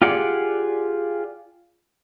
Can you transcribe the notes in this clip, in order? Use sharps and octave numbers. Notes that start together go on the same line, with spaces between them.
F4 G4 G#4 D5 F#5